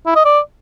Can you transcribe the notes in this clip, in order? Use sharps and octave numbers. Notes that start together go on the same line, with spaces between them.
E4
D#5
D5